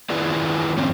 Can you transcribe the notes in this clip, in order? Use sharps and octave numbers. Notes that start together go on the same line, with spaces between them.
D#3 E4 F4 G#4 B4 D5
F2 C4 C#4